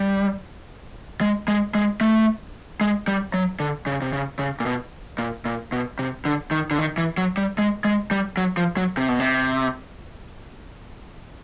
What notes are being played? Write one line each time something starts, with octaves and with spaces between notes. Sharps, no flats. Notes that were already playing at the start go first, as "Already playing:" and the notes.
Already playing: G3
G#3
G#3
G#3
A3
G#3
G3
F#3
D3
C#3
C3
C#3
C#3
A#2
B2
A#2
A#2
B2
C3
D3
D#3
D3
D#3
E3
F#3
G3
G#3
G#3
G3
F#3
F3
F#3
C3
B2
C3